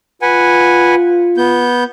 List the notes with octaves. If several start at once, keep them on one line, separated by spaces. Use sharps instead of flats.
F4 B4 F#5 G#5
B3 G6